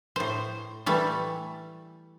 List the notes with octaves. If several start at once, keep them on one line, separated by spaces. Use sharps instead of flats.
A2 C5
E3 G3 A3